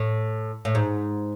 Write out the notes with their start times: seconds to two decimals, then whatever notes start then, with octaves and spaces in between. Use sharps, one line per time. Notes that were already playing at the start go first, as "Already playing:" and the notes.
Already playing: A2
0.65 A2
0.75 G#2